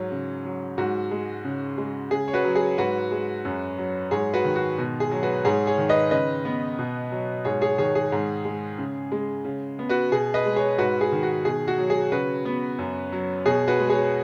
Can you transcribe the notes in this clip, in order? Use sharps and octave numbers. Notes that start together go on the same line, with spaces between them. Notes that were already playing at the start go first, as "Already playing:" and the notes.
Already playing: G#2 F#3
C#3
F#3
G#2 F#4
G#3
C#3
G#3
C#3 G#4
C#5
F#4 B4
F#3
G#4
G#2 F#4 B4
G#3
F#2
F#3
G#2 G#4 C#5
F#4 B4
D#3
F#4
B2
G#4
F#3
F#4 B4
G#2 G#4 C#5
G#4 C#5
D#3
B4 D#5
C#3 B4 D#5
B3
B2
F#3
G#2 G#4 C#5
G#4 C#5
D#3 G#4 C#5
G#4
G#2
G#3
C#3
G#3
C#3
B3
F#4 B4
B2 G#4
B4 D#5
G#3
G#4 C#5
G#2 F#4 B4
G#4
D#3
F#4
B2 G#4
F#4
F#3
G#4
C#3 F#4 B4
B3
F#2
F#3
B2 G#4 C#5
F#4 B4
G#3
G#4 C#5